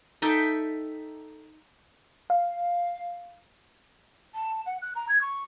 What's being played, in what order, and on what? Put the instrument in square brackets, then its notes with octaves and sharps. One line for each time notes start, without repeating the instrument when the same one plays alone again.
[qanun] D#4 A4 E5 G5
[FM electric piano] F5
[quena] A5
F#5
F#6
A#5
G#6
C#6